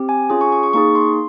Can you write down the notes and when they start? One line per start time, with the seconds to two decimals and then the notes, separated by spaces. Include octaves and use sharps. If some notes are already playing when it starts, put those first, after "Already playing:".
Already playing: C4 G4
0.09 G#5
0.30 C#4 F4 G#4 G#5
0.41 C#6
0.52 C#6
0.63 C#6
0.73 A#3 D#4 G#4 C#6
0.95 C6